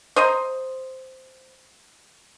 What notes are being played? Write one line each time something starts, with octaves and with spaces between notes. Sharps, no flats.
C5 D#5 A#5 C6